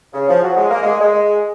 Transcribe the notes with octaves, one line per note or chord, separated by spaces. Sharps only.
C#3
F3
F#3
G#3
A#3
G#3
G#3